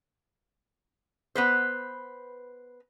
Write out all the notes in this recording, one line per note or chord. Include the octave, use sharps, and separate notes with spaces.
B3 B4 C5